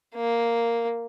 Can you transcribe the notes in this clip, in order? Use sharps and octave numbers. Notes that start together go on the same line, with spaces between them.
A#3